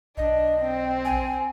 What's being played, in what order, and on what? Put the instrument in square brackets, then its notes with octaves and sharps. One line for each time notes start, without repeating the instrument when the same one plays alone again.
[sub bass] B1 [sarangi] D4 [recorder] D#5
[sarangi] C4
[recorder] G#5